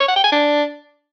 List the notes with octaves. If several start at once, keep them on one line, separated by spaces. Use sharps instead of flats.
C#5
F#5
G5
G#5
D4